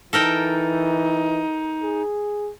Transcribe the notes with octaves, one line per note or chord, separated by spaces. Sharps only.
E3 D#4 A4 A#4 G5
G#4